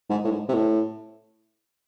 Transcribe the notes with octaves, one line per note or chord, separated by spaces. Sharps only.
G#2
A2
G#2
C3
A2